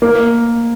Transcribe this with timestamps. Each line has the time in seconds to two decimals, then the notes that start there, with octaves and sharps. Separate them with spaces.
0.02 A#3